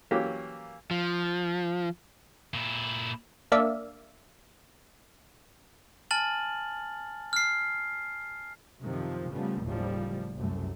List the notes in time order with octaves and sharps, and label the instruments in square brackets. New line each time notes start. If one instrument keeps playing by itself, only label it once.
[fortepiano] E3 F#3 A#3 C#4 G4
[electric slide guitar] F3
[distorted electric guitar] A#2 E4
[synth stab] A#3 D4 D5 E5 F5
[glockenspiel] G#5 A5 F6 A6 F#7
F6 C7
[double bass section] F#2 C3 D#3 F3
C#3 F3 G3 A3 B3
F#1 D#2 A2 C#3 F3 G3
C2 F#2 A3